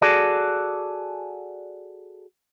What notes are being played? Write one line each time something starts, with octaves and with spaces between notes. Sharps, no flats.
F#4 G#4 A4 D5